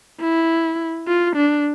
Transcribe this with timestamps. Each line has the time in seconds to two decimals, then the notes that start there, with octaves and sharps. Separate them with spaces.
0.21 E4
1.07 F4
1.36 D4